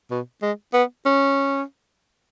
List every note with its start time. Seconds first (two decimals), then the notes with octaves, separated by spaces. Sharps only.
0.11 B2
0.42 G#3
0.74 B3
1.05 C#4